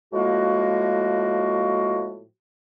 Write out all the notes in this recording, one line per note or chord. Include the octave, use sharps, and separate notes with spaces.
A2 F3 G#3 A#3 F#4